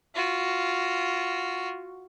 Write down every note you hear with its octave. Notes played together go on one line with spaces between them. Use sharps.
F4 F#4